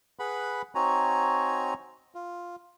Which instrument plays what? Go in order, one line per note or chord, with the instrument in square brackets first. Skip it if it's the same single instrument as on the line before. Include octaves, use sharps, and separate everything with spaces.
[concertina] G#4 B4 F#5 B5
C4 D#4 F#4 C#5 G#5 A#5
F4